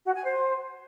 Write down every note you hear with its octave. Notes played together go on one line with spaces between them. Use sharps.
F#4
G#5
C5